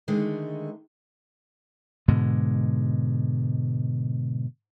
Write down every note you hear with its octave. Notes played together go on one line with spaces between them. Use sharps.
D3 D#3 G#3 A3
G#2 B2 D3 G#3